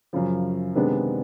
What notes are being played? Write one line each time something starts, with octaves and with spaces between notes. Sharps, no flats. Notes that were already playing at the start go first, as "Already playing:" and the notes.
F#2 C#3 F3
C3 D#3 G#3 B3 D4